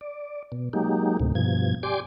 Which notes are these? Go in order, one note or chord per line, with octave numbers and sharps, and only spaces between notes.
D5
B2
F#3 G#3 A#3 D#4 G4
D2 A2 C3
G2 B2 F3 G#6
G4 D5 G#5 C6 D6